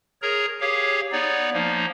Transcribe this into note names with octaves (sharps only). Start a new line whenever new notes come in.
G#4 A#4 C#5 A#5
G4 G#4 C#5 F5
B3 D#4 C#5 D5
F3 A#3 D#4